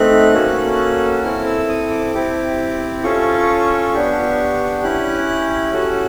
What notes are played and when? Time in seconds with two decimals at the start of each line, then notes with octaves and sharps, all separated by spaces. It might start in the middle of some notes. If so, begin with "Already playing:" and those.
Already playing: A3 C4 D#4 F#6
0.33 A#3 C#4 F#4 A4
1.23 C4 E4 A4 F6
1.46 E6
1.69 D#6
1.91 D6
2.14 C4 E4 G4
3.04 C#4 F4 A4 C#6
3.94 B3 D4 G4
4.83 C#4 E4 G4 F#6
5.73 C#4 F#4 A4